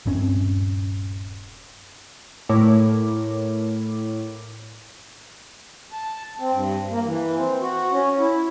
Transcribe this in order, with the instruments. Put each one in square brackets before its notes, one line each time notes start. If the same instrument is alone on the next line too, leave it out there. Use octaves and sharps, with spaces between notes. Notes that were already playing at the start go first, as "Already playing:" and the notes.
[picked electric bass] D#1 G2 C4 C#4
[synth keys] A2 A3 E4 A#4 C#5 D6
[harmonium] A5
C4
G2
A#3
E3
C4
F#4
C#4
E4